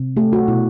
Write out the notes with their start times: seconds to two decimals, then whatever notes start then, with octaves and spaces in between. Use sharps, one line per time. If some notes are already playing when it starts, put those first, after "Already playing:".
Already playing: C3
0.17 A3 G4
0.33 F#4
0.48 B2 E4